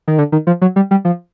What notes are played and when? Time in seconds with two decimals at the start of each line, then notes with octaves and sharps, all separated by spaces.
0.08 D#3
0.18 D3
0.32 D#3
0.47 F3
0.61 F#3
0.76 G3
0.91 G3
1.05 F3